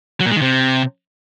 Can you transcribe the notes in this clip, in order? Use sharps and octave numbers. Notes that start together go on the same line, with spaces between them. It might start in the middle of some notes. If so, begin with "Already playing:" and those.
F#3
A#2
G#3
D#3
C3